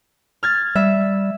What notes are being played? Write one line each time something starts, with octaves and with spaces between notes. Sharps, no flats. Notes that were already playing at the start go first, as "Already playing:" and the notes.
F6 G#6 A6
G3 E5